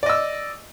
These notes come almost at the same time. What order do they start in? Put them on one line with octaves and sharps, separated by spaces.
D5 D#5 E6